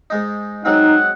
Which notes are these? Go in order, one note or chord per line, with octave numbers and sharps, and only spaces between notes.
G#2 G#3 D#4
F#3 G#3 C4 D#4 F#5